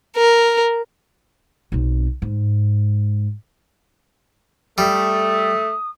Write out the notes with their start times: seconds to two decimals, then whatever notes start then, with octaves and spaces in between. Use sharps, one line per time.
0.17 A#4
1.72 B1 C4
2.22 G#2
4.78 G3 A3 D#6